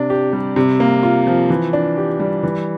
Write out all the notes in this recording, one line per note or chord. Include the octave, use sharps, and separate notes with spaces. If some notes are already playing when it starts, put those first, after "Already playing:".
Already playing: C3 D4
G4
G3
C3
A#3
F4
F3
E3
D4
G4
G3
E3